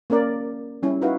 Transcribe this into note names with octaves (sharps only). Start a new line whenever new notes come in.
A#3 C#4 A#4 D5
G3 C#4 E4
D#4 E4 F#4 B4 F5